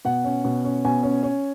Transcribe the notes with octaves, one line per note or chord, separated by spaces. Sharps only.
B2 F#5
C#4
B2
C#4
B2 G#5
C#4
C#4